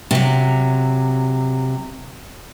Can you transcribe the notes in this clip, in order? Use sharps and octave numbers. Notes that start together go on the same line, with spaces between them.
C3 F#3